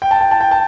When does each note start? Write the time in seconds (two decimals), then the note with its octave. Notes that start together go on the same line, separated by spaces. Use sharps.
0.02 G5
0.11 A5
0.21 G5
0.31 A5
0.41 G5
0.51 A5